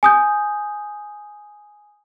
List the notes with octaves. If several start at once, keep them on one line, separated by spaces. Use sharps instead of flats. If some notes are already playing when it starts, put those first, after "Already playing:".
G#5 D#6 G6